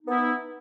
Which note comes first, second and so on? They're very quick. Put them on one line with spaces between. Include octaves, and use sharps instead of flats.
D#4 B3 E4